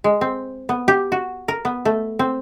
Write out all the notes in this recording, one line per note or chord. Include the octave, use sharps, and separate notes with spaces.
G#3
C4
B3
G4
F#4
A#4
B3
A3
C4